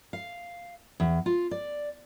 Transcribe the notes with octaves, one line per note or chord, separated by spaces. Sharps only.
F5
E2
F4
D5